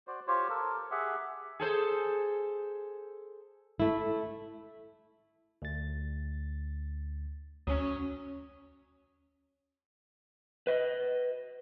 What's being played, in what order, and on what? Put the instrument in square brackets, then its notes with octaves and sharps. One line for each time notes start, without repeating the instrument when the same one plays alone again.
[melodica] F#4 C5 D5
F4 G4 C5 C#5
A4 A#4
G4 G#4 E5 F#5
[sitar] G#4 A4 C5
[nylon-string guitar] A3 E4
[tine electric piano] D2 A6
[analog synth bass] D#2 [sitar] F#3 C#4 [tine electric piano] D#6
[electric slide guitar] B4 D#5